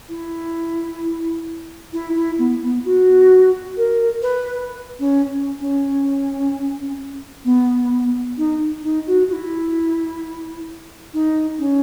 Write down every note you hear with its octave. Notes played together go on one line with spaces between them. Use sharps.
E4
E4
E4
B3
B3
F#4
A#4
B4
C#4
C#4
B3
D#4
D#4
F#4
F#4
E4
D#4
C#4